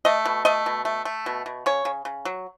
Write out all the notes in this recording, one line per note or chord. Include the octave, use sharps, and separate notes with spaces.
A3 D#5
B2
A3 D#5
B2
A3
A3
B2
B2
C#3 C#5
C#3
C#3
F#3